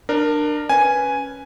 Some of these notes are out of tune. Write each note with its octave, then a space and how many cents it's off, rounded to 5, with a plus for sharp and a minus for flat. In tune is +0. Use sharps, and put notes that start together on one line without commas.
D4 +25 A#4 +0
C#4 +0 B4 +0 G#5 +0